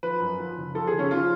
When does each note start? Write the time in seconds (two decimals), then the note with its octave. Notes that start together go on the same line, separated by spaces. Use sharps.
0.03 F3 B4
0.20 F#2
0.39 F3
0.57 F#1
0.75 F3 A4
0.87 F#1 G#4
0.99 C#4
1.11 F3 F4